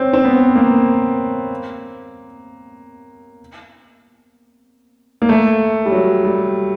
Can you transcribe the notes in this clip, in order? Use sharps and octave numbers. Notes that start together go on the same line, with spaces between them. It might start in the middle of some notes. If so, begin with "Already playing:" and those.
Already playing: C4 C#4
C4
B3
A#3
A#3
A3
G3
F#3
G3